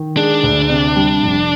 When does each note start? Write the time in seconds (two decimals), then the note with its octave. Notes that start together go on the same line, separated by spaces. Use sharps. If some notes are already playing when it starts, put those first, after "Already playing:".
Already playing: D#3
0.16 G#3 D4
0.43 D2
0.69 C3
0.96 G3
1.23 F1